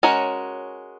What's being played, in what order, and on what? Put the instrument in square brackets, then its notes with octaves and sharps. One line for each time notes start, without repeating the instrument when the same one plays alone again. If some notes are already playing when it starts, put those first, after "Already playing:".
[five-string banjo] G#3 C#4 F#4 A#4 C#5